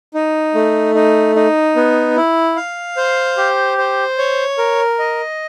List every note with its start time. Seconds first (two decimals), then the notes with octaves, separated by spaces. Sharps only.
0.14 D#4
0.55 A3
0.95 D#4
1.36 D#4
1.76 B3
2.17 E4
2.56 F5
2.97 C5
3.37 G4
3.78 C5
4.18 C#5
4.58 A#4
4.99 D#5